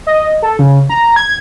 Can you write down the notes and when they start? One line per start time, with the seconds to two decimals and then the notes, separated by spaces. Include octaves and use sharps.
0.07 D#5
0.42 A4
0.59 C#3
0.90 A#5
1.16 G#6